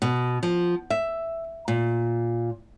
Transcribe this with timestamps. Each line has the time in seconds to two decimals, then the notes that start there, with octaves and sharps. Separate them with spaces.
0.02 B2
0.43 F3
0.90 E5
1.68 A#2